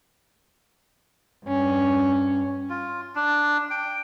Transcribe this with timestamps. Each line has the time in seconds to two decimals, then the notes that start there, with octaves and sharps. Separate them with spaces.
1.46 G2 C#4
2.70 F4
3.15 D4
3.70 G5